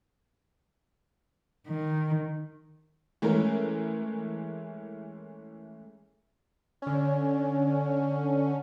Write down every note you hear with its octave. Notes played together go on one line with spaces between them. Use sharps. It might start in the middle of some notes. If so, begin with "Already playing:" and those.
D#3
E3 G#3 A3 C#4 A#4
D3 C#4